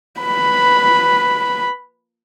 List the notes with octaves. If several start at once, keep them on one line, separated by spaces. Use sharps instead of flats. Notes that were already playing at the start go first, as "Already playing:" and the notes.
B4 B5